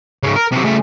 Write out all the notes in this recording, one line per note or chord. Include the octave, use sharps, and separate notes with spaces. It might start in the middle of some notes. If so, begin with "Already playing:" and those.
G#2 C#3
A#4
C3 F#3
C#3 A3